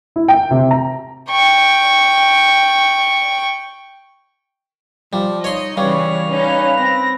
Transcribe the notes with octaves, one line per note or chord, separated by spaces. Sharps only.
E4
G5
C3
A#5
G5 C#6
F3 G3
D#4 C#5 D#5 C6
C#3 E3 G3 B4 C#5 F5
C#4 D#4 B4
C4 A#6